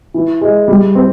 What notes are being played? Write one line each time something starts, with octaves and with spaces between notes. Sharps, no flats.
E3
G#3
G3
C4